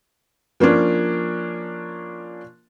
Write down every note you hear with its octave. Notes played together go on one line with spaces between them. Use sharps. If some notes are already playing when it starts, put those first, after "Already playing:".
F3 A#3 C#4 D4